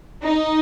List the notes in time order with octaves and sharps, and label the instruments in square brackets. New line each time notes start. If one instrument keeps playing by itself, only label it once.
[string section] D#4